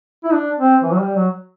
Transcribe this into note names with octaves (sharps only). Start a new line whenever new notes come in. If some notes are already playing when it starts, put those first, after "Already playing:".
E4
D4
C4
E3
F#3
G3
F#3